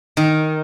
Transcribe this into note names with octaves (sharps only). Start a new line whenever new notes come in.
D#3